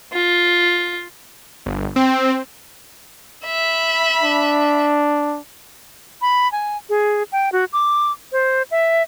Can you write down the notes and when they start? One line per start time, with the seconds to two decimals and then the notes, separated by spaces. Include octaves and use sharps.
0.13 F4
1.66 G1
1.96 C4
3.45 E5 B5
4.23 D4
6.21 B5
6.52 G#5
6.89 G#4
7.32 G5
7.52 F#4
7.73 D6
8.32 C5
8.71 E5